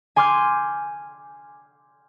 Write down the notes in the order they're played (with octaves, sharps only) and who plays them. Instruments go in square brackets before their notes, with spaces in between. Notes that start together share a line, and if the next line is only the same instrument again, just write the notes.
[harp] G#5 C6 D6 F6 G6 G#6